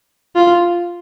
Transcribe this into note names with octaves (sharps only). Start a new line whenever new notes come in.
F4